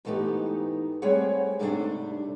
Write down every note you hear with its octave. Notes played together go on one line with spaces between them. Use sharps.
G#2 E3 A3 B3 D#4 G4
G3 A3 C4 G#4 C#5 F#5
G#2 C3 G3 A3 C4 D4